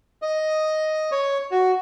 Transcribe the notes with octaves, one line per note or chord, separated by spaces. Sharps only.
D#5
C#5
F#4